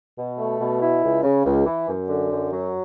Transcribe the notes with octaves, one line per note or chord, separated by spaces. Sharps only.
B2
A3
B2
E4
C#2
C#3
C#2
E3
F#2
D3
F#2
F#3